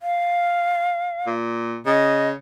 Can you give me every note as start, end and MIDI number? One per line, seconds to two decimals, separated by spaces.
0.01 1.32 77
1.27 1.79 46
1.86 2.34 49
1.86 2.28 75